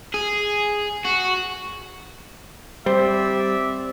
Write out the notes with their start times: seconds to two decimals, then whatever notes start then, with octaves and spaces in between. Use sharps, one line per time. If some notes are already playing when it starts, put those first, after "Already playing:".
0.14 G#4
1.05 F#4
2.86 G3 C4 C5 D5 E5